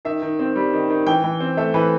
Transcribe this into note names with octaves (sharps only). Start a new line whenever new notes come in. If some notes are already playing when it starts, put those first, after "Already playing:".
D#3 E5
D#3
C4
G3
D#3
D#3
E3 G5
E3
C4
A3 E5
E3 B4